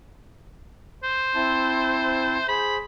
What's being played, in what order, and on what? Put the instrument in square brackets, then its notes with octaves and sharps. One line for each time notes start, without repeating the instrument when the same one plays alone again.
[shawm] C5
[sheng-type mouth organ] C4 E4 A5
[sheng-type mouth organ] G#4 C5 [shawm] B5